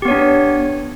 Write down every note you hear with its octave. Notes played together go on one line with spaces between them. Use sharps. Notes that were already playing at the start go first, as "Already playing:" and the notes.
B3 D4 G4 C#5